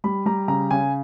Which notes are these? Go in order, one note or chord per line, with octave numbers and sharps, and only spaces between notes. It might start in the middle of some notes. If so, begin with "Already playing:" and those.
G3 B5
G3 A#5
C#3 A#5
C#3 G#5